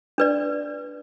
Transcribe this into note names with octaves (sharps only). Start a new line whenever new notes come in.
D4 B4 D5